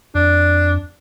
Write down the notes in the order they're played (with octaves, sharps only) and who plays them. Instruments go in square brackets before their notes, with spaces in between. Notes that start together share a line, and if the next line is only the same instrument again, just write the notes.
[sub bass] F2 [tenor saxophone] D4